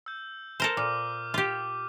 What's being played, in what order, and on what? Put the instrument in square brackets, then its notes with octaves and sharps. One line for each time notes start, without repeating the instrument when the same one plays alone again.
[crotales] E6 G6
[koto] A4 A#4 C5
[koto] A#2 [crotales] D6 F6 D#7
[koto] F4 G4